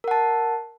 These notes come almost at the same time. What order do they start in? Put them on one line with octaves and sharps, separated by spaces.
A#4 F#5 A5